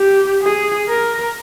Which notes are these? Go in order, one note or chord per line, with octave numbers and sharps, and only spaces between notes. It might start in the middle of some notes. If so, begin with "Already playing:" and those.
Already playing: G4
G#4
A#4